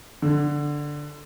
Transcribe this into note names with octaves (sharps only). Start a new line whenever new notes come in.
D3